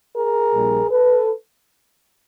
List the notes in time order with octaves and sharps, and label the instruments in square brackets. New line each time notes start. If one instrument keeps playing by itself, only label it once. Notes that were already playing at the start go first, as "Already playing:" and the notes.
[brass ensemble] G#4 A#4
A#1 A#2 G3
A4 B4